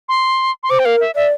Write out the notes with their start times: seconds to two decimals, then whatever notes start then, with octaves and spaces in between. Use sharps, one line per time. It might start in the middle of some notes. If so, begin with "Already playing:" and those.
0.09 C6
0.63 C6
0.70 C5 D6
0.79 G5
0.85 A#4 F5
1.00 E5
1.16 D5 E5